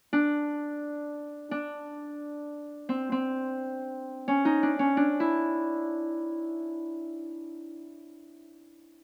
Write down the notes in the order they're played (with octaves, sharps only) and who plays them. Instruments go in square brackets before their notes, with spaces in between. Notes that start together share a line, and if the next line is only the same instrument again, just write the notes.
[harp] D4
D4
C4
C4
C#4
D#4
D4
C#4
D4
E4